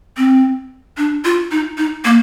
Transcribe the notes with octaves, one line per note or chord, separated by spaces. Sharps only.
C4
D4
F4
D#4
D#4
A#3